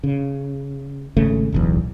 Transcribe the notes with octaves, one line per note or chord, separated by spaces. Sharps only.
C#3
G#1 C#3 A3
D1 B1 E2